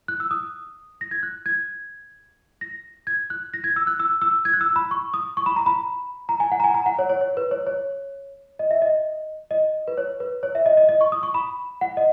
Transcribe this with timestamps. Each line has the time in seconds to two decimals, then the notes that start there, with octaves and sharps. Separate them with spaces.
0.08 F#6
0.20 E6
0.31 D#6
1.01 A#6
1.11 G#6
1.23 F#6
1.46 G#6
2.61 A#6
3.07 G#6
3.30 F#6
3.54 A#6
3.64 G#6
3.76 E6
3.87 F#6
4.00 E6
4.22 E6
4.45 G#6
4.54 F#6
4.61 E6
4.76 B5
4.91 C#6
5.14 D#6
5.37 C#6
5.46 B5
5.56 A#5
5.66 B5
6.29 A#5
6.40 G#5
6.52 F#5
6.60 A#5
6.64 G#5
6.74 A#5
6.86 F#5
6.99 C#5
7.10 C#5
7.21 C#5
7.37 B4
7.51 C#5
7.67 C#5
8.59 D#5
8.71 E5
8.82 D#5
9.51 D#5
9.88 B4
9.98 C#5
10.20 B4
10.43 C#5
10.55 E5
10.66 D#5
10.77 D#5
10.89 D#5
11.01 C#6
11.12 D#6
11.23 C#6
11.34 B5
11.81 F#5
11.97 D#5